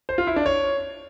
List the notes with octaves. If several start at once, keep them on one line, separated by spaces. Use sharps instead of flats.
C5
F4
E4
D4
C#5